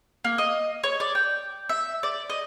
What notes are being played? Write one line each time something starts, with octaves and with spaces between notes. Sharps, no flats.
A#3
D#5
C#5
D5
G5
E5
D5
D#5